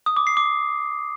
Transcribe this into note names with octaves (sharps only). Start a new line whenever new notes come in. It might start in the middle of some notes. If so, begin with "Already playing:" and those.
D#6
D6
C7
D6